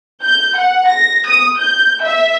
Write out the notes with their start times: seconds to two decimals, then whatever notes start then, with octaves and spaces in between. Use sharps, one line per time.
0.23 G6
0.57 F#5
0.88 A#6
1.27 D#6
1.59 G6
2.04 E5